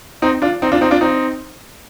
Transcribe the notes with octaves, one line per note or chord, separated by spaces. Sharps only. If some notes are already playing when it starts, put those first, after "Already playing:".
C4 D#4
D4 F4
C4 D#4
D4 F4
C4 D#4
D4 F4
C4 D#4